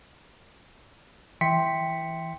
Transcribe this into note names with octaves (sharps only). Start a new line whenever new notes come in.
E3 E5 G5 C6 B6 C#7